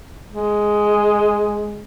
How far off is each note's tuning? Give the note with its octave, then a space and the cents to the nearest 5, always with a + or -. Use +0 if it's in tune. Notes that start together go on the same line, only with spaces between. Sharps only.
G#3 +5